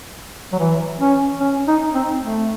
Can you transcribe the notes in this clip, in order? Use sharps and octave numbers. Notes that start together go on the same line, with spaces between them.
F#3
E3
C#4
C#4
D#4
C4
A3